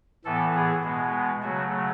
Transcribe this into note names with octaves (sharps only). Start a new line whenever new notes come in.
A2 E3 B3 A4
G#4
B2 G#3 B3
C#3 F#3 A3 F#4